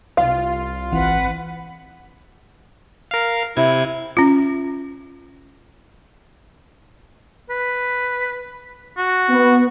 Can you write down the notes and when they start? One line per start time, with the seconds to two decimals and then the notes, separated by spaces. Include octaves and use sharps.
0.17 C2 F4 F5
0.92 G#1 E3 C4 B4 F#5
3.11 A#4 F5
3.57 C3 E4 G#6
4.17 C#4 F4
7.50 B4
8.97 F#4
9.30 B3